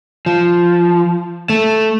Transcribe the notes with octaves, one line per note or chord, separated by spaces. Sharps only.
F3
A3